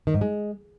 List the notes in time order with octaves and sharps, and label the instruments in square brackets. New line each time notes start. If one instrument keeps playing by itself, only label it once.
[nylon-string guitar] D#3
G#2
G#3